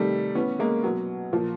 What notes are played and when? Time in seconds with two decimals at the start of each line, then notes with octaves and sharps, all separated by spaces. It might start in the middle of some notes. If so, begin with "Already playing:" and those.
Already playing: C3 D#3 G3 A3
0.35 A2 E3 B3 C#4
0.59 G#3 A#3
0.84 B2 F#3
1.33 A#2 F3